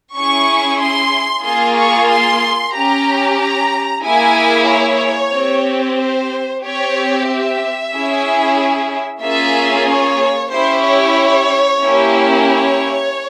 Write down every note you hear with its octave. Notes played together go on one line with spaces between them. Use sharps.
C#4 E4 G#4 C#6
C6
A#3 F4 G#4 C6
C#6
C6
C#4 G4 A#5
A#5
A#3 E4 G#4 G#5
C#5
C4 G4
C5
C4 G4 C#5
E5
C#4 E4 G#4
A#3 C#4 F4 G#4 E5
C#5
C#4 E4 G4 C5
C#5
A#3 C#4 E4 G4
C#5